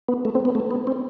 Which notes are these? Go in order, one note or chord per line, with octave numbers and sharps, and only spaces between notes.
B3
A3
C4
B3
A3
B3
C4